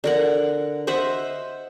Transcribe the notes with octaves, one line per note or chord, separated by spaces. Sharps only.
D3 A#4 F#5
C5 D#5 E5 F#5